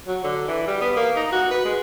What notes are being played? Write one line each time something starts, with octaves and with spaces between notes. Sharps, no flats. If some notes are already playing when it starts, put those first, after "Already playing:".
F#3
D3
E3
G3
B3
A#3
D#4
F#4
B4
G#3